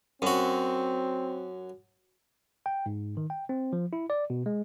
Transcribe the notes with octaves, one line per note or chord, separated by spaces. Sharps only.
F#2 C4 F#4
G5
G#2
D#3
G5
C4
F3
E4
D5
B2
G#3